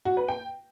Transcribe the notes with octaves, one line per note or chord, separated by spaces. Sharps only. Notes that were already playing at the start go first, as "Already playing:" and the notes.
F#4
B4
G5